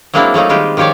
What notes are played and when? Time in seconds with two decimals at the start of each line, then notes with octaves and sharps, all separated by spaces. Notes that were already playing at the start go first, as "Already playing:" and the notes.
0.14 F#3 G#3 A#3 C4 D4 E4
0.34 F#3 A3 A#3 D#4
0.49 D#3 G3 G#3 F4 G4
0.77 D#3 F3 G4 C#5 D5